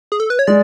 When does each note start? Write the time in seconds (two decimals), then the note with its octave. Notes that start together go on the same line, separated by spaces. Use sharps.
0.12 G#4
0.20 A4
0.30 B4
0.39 C#5
0.47 G#3 D5